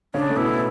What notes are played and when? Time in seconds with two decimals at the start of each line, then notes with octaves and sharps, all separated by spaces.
0.14 C#3 C#4 D4
0.30 A3
0.36 B2 B3 E4